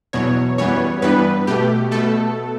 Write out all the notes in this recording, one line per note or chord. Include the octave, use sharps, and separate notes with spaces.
E2 B2 F#3 C#5
F#2 E3 G3 B3 C#5
G2 E3 G3 B3 B4
B2 A3 G4
B2 A3 A4